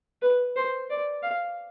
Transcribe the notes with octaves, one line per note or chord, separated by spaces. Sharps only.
B4
C5
D5
F5